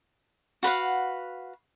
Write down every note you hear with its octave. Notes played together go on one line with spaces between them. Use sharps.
F#4 B4 F5 F#5